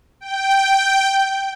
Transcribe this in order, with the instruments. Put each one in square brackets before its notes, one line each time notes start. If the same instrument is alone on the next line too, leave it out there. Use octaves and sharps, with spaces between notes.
[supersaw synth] G5